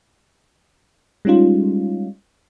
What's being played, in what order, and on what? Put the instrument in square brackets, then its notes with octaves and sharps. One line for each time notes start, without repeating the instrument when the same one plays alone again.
[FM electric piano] G3 G#3 C#4 D#4 F4